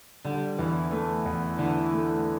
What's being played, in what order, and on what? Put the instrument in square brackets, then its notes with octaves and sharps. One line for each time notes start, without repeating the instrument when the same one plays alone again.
[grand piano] D3 [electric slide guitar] G3
[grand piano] E2 [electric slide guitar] E3
[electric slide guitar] E3 [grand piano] A3
[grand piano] E2
[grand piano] D3 [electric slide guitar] E3
[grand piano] A3